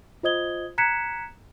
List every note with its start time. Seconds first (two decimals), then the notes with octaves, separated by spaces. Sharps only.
0.23 F4 C5 D#5 D#6 G#6 G7
0.78 A#5 F#6 G#6 B6 C#7 E7